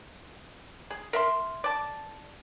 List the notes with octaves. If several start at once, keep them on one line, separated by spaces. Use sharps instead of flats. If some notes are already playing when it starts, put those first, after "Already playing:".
G#4
A#4 E5 C6
D5 A5